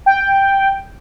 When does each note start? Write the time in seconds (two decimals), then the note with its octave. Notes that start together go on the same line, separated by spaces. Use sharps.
0.06 G5